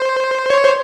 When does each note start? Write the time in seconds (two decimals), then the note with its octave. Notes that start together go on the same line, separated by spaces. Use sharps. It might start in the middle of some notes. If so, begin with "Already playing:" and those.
Already playing: C5
0.50 C#5
0.64 C5